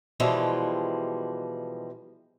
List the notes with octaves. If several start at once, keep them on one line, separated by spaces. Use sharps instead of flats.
B2 E3 F3 G3 G#3